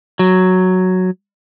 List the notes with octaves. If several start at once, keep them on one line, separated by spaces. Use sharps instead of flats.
F#3